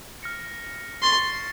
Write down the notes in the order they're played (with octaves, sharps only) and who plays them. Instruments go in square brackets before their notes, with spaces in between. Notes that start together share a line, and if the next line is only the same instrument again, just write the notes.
[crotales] F6 A#6 C#7
[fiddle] C6 [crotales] C#6 A6 C7